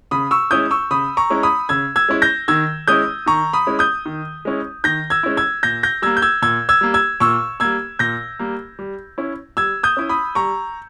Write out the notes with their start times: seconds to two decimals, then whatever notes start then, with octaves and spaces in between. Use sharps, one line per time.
0.11 C#3 B5 D#6
0.31 C#6 E6
0.51 G#3 C#4 E4 D#6 G6
0.71 C#6 E6
0.91 C#3 B5 D#6
1.17 A#5 C#6
1.30 G#3 C#4 E4
1.43 B5 D#6
1.69 C#3 E6 G#6
1.96 E6 G#6
2.09 G#3 C#4 E4
2.22 G6 A#6
2.48 D#3 E6 G#6
2.88 G#3 C#4 E4 D#6 G6
3.26 D#3 A#5 C#6
3.53 B5 D#6
3.67 G#3 C#4 E4
3.79 D#6 G6
4.06 D#3
4.45 G#3 C#4 E4
4.84 D#3 G6 A#6
5.10 E6 G#6
5.23 G#3 C#4 E4
5.37 E6 G#6
5.63 A#2 G6 A#6
5.83 G6 A#6
6.02 G3 A#3 E6 G#6
6.17 G6
6.22 E6 G#6
6.42 A#2 E6 G#6
6.69 E6 G#6
6.81 G3 A#3
6.94 E6 G#6
7.20 A#2 C#6 E6
7.60 G3 A#3 E6 G#6
7.99 A#2 G6 A#6
8.39 G3 A#3
8.79 G3
9.18 C#4 E4
9.57 G3 E6 G#6
9.83 D#6 G6
9.97 C#4 E4
10.09 B5 D#6
10.35 G3 A#5 C#6